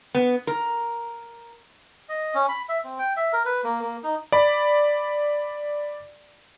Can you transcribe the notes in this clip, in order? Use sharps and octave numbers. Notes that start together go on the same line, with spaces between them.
B3
A#4
D#5
C#4
B5
E5
C4
G5
E5
A#4
B4
A#3
A#3
D#4
D5 B5